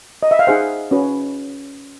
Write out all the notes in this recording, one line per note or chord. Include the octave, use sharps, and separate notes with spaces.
D#5
E5
F5
D#4 G#4 C5 F#5
C#4 F#4 B4